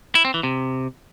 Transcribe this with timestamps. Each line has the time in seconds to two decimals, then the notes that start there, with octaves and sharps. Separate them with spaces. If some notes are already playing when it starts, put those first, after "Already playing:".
0.15 E4
0.25 C4
0.34 E3
0.43 C3